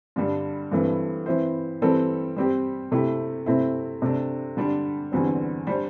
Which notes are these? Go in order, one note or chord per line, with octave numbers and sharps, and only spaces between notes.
G2 D3 G3 D4
G2 E3 A3 C4
E3 C4 E4 C5
E3 G3 C4 A4
G3 C4 G4 C5
C3 A3 E4 G4
C3 A3 C4 E4
C3 A3 D4
D3 G3 D4
E2 D3 G3 C4
G3 D4 C5